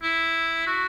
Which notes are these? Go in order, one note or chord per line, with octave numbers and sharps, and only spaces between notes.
E4
F#4